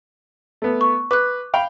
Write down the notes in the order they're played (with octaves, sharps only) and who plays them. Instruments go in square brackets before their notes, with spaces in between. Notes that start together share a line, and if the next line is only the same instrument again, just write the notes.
[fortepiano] A3 B3
[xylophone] C#6
[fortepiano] B4 [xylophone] D6 F#6
[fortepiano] F5 G5 B5